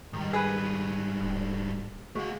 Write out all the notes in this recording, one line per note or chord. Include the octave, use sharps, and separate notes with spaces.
G#2 D#3 G3
G#4 B4
D1
G#3 A3 F#4 F5